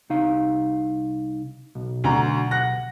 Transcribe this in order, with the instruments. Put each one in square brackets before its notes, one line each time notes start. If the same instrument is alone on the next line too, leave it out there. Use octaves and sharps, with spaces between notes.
[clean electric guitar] C2 D#4 F5
B1
[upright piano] D2 A#5
F#5 F#6 A#6